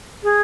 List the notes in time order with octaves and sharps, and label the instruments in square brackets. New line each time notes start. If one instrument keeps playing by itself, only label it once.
[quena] G#4